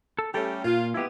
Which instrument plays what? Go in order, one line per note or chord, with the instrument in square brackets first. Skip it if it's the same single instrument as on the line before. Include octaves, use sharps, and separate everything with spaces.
[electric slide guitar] A4
[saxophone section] G3 A3 C#4 [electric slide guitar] G4 A4 G5
[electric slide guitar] A#2 [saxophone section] F4
[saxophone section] F3 G#3 B3 [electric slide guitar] E4 G4